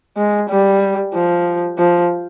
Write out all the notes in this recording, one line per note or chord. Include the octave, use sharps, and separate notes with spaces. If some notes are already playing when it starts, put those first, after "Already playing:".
G#3
G3
F3
F3